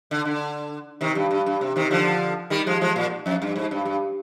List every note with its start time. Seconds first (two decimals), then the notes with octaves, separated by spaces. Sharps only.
0.11 D3
0.25 D3
1.01 C3 D#3
1.15 G2
1.31 G2
1.46 G2
1.61 C3
1.76 C3 D#3
1.91 D3 F3
2.50 D#3 G3
2.66 F3 G#3
2.81 F3 G#3
2.96 A#2
3.26 F2
3.42 G2
3.56 G#2
3.71 G2
3.85 G2